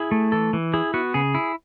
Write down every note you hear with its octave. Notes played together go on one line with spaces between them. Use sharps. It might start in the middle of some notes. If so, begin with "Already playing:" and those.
Already playing: E4 G#4
A3
E3 A4
E3
E4 G#4
B3 F#4
C#3 G#4
E4